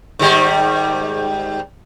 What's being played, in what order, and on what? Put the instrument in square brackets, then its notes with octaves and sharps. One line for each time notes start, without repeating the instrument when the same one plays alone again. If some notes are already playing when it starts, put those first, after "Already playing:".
[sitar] G#2 D#3 G3